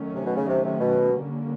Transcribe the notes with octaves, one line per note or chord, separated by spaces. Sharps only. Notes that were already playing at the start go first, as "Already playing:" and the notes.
Already playing: D#3 F#3 A3 C#4
C3
B2
C#3
C3
C3
B2
D3 G3 A#3 C#4